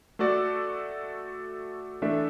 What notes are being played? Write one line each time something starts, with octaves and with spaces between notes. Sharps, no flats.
A3 F#4 A4 D5
E3 A3 D4 A4 E5